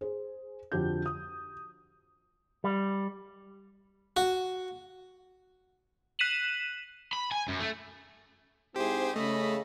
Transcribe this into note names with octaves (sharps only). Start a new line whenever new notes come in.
G#4 C5
F2 D3 F#4 G4 G6
D#6
G3
F#4
F#6 B6 D#7 E7 F#7
B5
G#5
F#2
A3
G#2 C4 E4 G4 G#4 C5
C#3 A3 D#5 B5